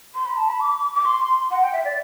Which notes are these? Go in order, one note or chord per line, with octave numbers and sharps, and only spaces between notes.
C6
B5
A5
B5
D6
D6
C6
F#5
G5
E5
D5